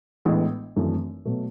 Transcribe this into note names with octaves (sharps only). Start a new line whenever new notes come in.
A1 A2 G#3 B3 D4
G#1 F#2 E3 A3 D4
B2 F#3 A3